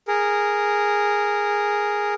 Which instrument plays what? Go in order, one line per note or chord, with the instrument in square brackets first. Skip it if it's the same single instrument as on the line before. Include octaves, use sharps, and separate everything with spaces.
[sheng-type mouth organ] G#4 A#4